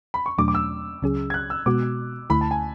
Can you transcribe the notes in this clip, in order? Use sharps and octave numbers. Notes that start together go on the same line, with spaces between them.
B5
C#6
E2 B2 F#3 A3 D4 D6
D6
E6
C#2 C#3 F#3 C#4 G#4
G#6
F#6
E6
B2 G#3 B3 F#4 D6
D2 D3 A3 E4 B5
A5
G#5